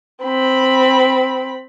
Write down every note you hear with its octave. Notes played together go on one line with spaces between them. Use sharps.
C4 B5